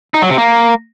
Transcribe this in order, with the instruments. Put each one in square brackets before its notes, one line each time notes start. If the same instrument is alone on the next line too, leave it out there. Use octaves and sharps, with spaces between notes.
[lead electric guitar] D#4
F#3
C3
A#3